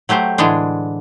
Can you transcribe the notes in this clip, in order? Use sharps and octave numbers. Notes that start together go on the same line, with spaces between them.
F#3 A3 G4 C5
A2 D3 E3 G#3 D4